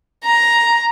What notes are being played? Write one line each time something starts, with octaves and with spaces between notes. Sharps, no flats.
A#5